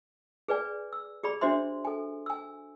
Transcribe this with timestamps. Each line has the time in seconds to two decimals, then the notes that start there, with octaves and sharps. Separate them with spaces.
0.48 G#4 B4 D5 G#5
0.93 E6
1.23 G4 G#4 D5 B5
1.41 D4 F#4 C5 E5 C6
1.85 A4 G#5
2.26 G#5 E6